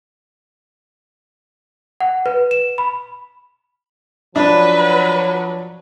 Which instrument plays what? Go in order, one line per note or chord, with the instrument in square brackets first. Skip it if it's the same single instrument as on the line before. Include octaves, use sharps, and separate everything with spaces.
[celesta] F#5
B4
E7
B5
[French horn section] F3 F#3 [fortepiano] D4 [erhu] B4